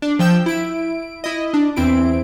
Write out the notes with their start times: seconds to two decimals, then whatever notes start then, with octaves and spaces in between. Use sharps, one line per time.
0.02 D4
0.19 F3 G5 E6 G6
0.46 E4 D7
1.24 E4 D#5
1.54 D4
1.76 E2 C4 E4 D7